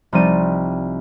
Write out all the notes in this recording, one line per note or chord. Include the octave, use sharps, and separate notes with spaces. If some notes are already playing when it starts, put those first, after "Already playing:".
C2 F3 C4 D#4 D5 D#7